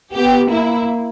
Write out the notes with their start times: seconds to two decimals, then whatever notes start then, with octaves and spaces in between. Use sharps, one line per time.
0.13 B3 G4
0.50 A#3 E4